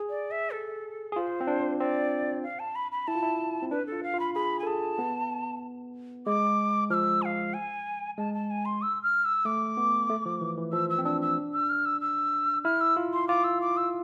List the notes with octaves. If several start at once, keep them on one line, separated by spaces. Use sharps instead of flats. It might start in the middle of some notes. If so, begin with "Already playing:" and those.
Already playing: G#4
D5
E5
A4
G#4
F4 C5
C4
D4
C4 D5
F5
A5
B5
B5
E4 A5
F4
E4
C4
D4 B4
A4
F4
F5
F4
B5
G#4 B5
G#5
A4
G#4 A5
B3
G#3 D6
F3 E6 F6
G#5
F5
G#5
G#3 A5
A5
G#5
C6
E6
F6
E6
A3 D6
B3
A3
F3
E3
E3
F3 E6
E6
C4
D4 E6
E6
E6
F6
E6
E6
E4 F6
E6
F4
C6
F4 D6
E6
D6
E6